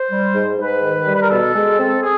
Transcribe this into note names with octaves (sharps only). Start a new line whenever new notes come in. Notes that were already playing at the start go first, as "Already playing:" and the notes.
Already playing: C5
G3
G#2
G#2 B4
D#3
G3
B4
A#4
B2 A4
G#3
C4
G#4